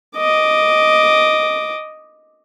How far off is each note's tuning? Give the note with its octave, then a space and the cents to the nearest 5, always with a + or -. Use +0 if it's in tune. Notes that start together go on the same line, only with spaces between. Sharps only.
D#5 +0 D6 +0